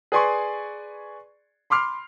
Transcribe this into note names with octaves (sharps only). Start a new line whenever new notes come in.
G#4 B4 D5 G#5 C6 C#6
B5 C6 D6 F6 C7